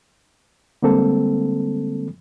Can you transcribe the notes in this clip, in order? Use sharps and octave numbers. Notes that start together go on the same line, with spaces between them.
D3 G3 G#3 A#3 C4 A4